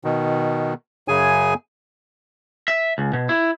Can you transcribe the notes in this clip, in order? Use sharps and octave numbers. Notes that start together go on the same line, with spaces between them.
B2 D#3
F#2 C#3 G#4 G#5
E5
C#2
B2
E4